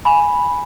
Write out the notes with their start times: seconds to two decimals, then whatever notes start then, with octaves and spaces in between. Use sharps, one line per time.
0.05 G#5 B5